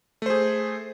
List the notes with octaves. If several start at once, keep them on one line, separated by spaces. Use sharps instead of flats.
A3 G#4 C5